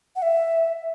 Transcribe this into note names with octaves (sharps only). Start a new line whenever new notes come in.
F#5
E5